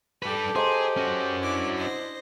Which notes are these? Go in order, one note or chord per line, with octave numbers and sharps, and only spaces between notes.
G3 G4 A4 B4
G#4 C5 D#5 A#5
C#4 F#4
D4 E4 D6
C5 D#5